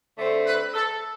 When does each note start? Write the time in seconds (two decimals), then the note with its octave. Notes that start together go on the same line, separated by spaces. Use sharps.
0.17 D3 A3 C4
0.45 B4
0.74 A4